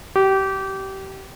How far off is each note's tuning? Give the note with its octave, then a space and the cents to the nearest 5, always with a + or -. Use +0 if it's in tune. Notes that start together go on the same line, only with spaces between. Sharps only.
G4 -25